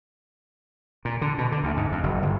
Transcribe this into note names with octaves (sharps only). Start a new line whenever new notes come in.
A#2
D3
B2
D3
D2
G#2
F2
F#1
G1